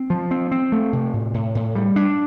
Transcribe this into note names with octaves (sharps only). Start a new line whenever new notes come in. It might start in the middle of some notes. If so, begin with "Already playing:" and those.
Already playing: C4
F3
C4
C4
A3
C3
A2
A2
A2
G3
D4